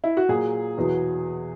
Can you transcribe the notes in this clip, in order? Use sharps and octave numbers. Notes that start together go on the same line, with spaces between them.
E4
F#4
A#2 F#3 G#4
E2 B2 F#3